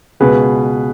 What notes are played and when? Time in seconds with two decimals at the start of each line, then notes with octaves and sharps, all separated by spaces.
0.20 C#2 B2 G#4 B4